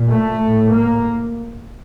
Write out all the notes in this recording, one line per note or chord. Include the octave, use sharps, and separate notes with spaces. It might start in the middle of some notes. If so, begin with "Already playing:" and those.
Already playing: A#2
A3
A2
A#3